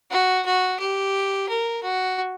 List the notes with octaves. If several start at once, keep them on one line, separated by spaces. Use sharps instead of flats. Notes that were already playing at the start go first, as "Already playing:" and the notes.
F#4
F#4
G4
A#4
F#4